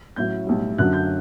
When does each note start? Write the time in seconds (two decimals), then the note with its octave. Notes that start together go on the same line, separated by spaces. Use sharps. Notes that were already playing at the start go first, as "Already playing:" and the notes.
0.16 A1 A2 F#3 G6
0.47 B1 A2 G3
0.78 F#2 D3 F#3 F#6
0.93 G6